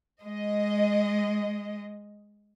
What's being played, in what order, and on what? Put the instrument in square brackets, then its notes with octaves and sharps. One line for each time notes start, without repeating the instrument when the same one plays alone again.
[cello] G#3 [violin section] D#5